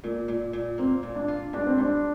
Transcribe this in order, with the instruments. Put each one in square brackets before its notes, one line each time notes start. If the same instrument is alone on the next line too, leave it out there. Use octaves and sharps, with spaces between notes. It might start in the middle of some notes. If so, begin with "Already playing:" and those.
[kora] A#2 [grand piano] A#3
[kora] A#2
A#2
[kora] A#3 [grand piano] C4
[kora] A#2
[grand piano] D4
[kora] F4
[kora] G2 [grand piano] D4
[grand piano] C4
[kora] G2 [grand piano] D4